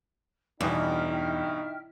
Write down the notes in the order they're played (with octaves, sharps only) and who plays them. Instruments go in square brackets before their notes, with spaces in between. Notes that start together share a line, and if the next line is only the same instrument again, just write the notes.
[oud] E2 [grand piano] G2 B2 E3 [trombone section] D#4 [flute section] E5 G5 F6